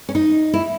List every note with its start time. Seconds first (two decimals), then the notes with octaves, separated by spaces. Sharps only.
0.09 C#4
0.15 D#4
0.54 E4